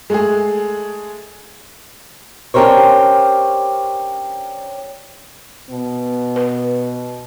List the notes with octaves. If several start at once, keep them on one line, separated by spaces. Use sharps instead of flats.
G#3 A3 G#4
C#4 D4 G4 A#4 C5 C#5
B2 B3
B4